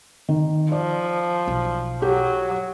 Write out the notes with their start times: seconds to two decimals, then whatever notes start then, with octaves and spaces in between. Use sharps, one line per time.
0.29 D#3
0.72 F3 D5
1.48 B1
2.02 F#3 G4